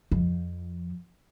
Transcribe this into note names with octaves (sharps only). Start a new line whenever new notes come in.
F2 F3